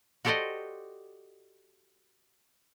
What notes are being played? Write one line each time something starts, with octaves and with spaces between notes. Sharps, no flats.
F#4 G4 A4 C5 D5 D#5